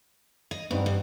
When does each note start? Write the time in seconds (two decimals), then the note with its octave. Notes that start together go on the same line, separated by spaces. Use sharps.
0.51 D#5
0.71 G2 B3 C4 D#4
0.86 G2